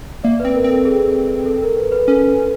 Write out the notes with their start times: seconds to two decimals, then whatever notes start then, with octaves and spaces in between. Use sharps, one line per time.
0.24 A#3 D5 E5
0.40 C4 B4
0.55 A#4
0.64 C4
0.70 A4
0.85 G#4
1.46 A4
1.62 A#4
1.77 B4
1.92 B4
2.08 C#4 A4